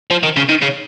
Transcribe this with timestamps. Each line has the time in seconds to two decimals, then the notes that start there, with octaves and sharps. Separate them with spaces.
0.11 F3
0.23 D#3
0.37 C#3
0.49 D#3
0.62 C#3